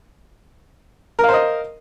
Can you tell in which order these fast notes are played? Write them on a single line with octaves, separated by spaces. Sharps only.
A#4 F5 C5 D#5